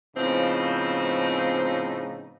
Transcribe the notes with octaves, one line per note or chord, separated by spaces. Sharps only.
A2 C#3 F3 B3 C4 D#4